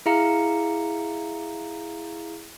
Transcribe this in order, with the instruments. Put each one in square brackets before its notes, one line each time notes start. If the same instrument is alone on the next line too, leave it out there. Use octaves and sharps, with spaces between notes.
[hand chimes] E4 G#4 E5 F5 A#5 C#7